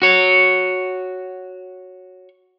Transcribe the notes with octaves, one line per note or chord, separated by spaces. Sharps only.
F#4 C#5